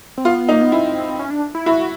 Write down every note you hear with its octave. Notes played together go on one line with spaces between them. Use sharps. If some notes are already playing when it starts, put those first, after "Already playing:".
C4
B3 F4
D#4
A#3
B3
C4 E4
C#4
D4
E4
E4 F#4